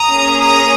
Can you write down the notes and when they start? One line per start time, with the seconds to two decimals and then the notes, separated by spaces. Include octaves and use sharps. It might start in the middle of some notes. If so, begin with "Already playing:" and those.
Already playing: A#5 D#6
0.08 A#3 C#4 G#4
0.39 A#5 D#6